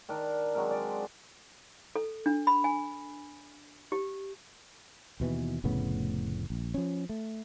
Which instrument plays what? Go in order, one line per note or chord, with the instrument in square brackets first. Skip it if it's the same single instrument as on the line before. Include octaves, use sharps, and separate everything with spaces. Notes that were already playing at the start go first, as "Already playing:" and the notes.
[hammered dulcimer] D#3 D4 A#4
F#3 G#3 C4 A#4
D5
[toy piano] A4
D4
B5
G#5
G4
[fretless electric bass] D#2 B2 E3
F1 A2 C#3 B3
A#1
F3 C#4
A3